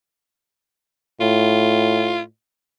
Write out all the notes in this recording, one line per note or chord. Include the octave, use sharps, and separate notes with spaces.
A2 F4